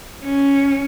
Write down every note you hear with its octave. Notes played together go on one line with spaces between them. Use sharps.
C#4